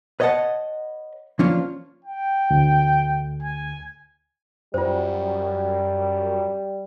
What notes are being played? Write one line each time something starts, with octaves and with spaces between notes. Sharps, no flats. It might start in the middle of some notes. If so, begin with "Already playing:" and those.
B4 C#5 D#5 F5 F#5 A5
F3 A#3 C#4 D4 F4
G5
D2
G#5
F#2 G3 F4 C5